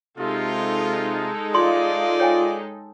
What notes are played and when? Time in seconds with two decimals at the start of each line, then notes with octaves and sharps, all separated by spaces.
0.18 C3 G#3 D#4 F4 A4
1.55 F4 D5 D#5 C6
2.20 C#5 G5 G#5